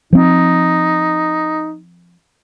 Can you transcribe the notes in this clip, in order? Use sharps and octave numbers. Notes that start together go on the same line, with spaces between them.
F3 C4 D#4